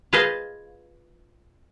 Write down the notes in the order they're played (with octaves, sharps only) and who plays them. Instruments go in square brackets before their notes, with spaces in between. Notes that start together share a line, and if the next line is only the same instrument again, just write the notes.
[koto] F4 G#4 B4 C5 D#5 F5